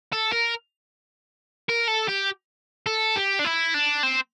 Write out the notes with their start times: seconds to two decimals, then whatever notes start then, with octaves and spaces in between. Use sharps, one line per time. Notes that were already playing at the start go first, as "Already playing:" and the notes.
0.13 A4
0.32 A#4
1.69 A#4
1.88 A4
2.09 G4
2.86 A4
3.16 G4
3.39 D4
3.44 E4
3.74 D4
4.03 C4